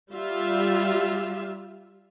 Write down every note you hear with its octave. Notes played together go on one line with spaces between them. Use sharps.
G3 F4 E5